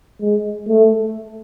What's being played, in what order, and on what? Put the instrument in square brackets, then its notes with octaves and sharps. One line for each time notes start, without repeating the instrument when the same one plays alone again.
[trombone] G#3
A3